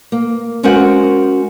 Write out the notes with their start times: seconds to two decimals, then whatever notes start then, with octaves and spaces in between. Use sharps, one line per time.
0.12 A#3
0.63 G#3 C#4 F#4 A#4 C5 F#5